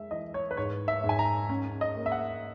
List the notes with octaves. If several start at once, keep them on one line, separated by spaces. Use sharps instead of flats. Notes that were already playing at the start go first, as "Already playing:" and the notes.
Already playing: G#3 E5
E3 D#5
C#5
B4
G#2 C#5
E5
G#2
G#5
A#5
C#4
D#5
A#3
E5
F#5